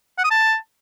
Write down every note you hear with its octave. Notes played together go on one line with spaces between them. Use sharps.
F#5
D#6
A5